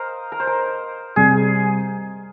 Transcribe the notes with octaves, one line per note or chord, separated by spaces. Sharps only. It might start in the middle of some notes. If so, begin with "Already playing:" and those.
Already playing: A#4 C5 D#5 F5
A#4
C5
A#4
C3 G3 G#4